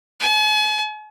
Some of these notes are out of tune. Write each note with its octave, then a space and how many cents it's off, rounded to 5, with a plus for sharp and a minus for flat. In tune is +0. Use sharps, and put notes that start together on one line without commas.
G#5 +45